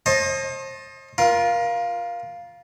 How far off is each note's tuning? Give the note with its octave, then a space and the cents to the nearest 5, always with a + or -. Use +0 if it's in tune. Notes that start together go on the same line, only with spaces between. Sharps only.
C5 +40 D#5 +0 A5 +0
F4 +0 A#4 +30